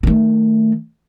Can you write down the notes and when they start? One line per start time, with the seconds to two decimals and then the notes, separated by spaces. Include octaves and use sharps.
0.03 D#3 A3